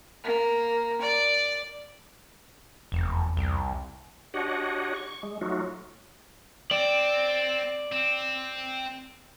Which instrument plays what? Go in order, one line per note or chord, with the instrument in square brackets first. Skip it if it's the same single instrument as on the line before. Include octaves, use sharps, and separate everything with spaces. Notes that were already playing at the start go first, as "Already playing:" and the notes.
[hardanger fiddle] A#3
D5
[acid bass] F1 [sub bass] E2
[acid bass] C2
[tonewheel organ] D4 F#4 G4 C#5 D#5 F#5
C#6
G#3
F#3 A3 D#4 F4 F#4
[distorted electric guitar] C4 [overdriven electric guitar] D5
[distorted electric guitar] C4